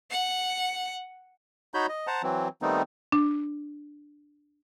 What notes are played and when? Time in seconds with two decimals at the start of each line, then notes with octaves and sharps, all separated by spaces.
0.11 F#5
1.74 D#4 F#4 C#5 B5 G6
1.89 D#5
2.07 C5 F#5 A5 A#5
2.23 E3 F#3 C4
2.62 D#3 G3 A3 B3 C4 D#4
3.12 D4